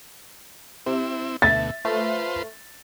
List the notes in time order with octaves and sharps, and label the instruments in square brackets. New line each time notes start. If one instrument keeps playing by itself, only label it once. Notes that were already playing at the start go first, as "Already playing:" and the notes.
[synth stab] C3 [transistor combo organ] C4 E4
[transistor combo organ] D2 B2 A3 [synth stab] E5 B6 [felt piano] A6
[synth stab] A3 [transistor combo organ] F4 B4 C5